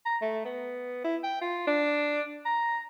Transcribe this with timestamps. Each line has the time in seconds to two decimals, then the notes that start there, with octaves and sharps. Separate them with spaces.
0.05 A#5
0.22 A3
0.45 B3
1.04 E4
1.24 G5
1.41 F4
1.67 D4
2.46 A#5